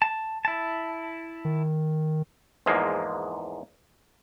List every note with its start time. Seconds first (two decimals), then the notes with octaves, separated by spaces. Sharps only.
0.02 A5
0.45 E4 A5
1.45 D#3
2.66 E2 G#2 F3 G#3 A#3